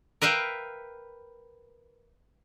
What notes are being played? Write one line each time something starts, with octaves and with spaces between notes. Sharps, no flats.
A#4 B4 E5 F5 G5